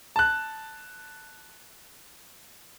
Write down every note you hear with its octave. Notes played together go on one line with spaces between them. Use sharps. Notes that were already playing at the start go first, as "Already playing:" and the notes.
A5 F#6